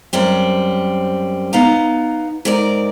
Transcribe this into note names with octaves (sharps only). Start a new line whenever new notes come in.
F#2 G3 C4
B3 D#4 F5 A#5
G#2 A#4 D5